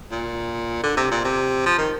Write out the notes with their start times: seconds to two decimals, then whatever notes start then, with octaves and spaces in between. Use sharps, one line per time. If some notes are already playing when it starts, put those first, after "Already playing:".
0.11 A#2
0.83 D3
0.97 C3
1.11 A#2
1.24 C3
1.66 F3
1.78 D#3